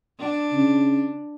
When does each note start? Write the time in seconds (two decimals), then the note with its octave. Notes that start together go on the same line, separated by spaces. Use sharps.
0.19 D4
0.53 C#3